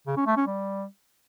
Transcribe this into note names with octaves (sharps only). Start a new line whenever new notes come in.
C#3
C#4
A3
C#4
G3